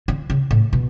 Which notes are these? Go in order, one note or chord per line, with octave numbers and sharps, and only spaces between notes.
D3
C#3
A2
B2